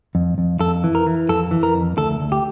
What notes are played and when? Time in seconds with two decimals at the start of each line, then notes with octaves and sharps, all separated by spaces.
0.15 F2
0.38 F2
0.60 F2 A4
0.84 E3
0.95 A#4
1.07 E3
1.29 F2 A4
1.51 E3
1.63 A#4
1.74 F2
1.97 D2 A4
2.20 D2
2.32 G4